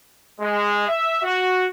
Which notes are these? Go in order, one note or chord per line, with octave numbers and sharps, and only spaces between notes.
G#3
E5
F#4